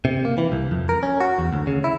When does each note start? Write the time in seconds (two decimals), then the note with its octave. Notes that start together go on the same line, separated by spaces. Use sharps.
0.05 C3
0.25 A#3
0.38 E3
0.52 C2
0.71 F2
0.89 A#4
1.03 C#4
1.20 F#4
1.39 E2
1.53 D2
1.67 C#3
1.84 E4